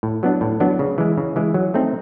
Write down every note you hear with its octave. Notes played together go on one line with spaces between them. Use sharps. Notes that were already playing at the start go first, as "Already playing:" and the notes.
A2
F#3 B3 D4
A2
F#3 B3 D4
C#3
E3 G#3
C#3
E3 G#3
F#3
A3 C4 D#4